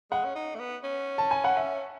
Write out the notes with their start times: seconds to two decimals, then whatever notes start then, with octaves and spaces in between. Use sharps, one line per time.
0.11 G#3 F#5
0.24 C#4
0.35 D#4
0.55 A3
0.59 B3
0.84 C#4
1.18 A5
1.31 G#5
1.44 F#5
1.57 E5